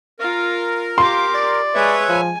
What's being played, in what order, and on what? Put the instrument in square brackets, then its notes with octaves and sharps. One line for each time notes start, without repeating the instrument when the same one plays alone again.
[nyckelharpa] F4 [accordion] A#4
[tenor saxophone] F4 [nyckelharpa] G4 D6 [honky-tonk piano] C6
[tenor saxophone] D5
[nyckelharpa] G#3 [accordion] B4 C#5 E5
[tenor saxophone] F3 [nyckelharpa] G#5